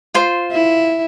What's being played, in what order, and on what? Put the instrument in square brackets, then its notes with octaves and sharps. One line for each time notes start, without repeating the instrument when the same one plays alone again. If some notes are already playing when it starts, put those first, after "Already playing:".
[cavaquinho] F4 C5
[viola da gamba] E4